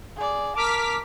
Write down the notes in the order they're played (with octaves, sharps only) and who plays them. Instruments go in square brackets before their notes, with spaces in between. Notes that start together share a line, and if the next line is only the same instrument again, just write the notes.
[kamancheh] G#4 D5
[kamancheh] A#4 A5 [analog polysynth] D6 F6 B6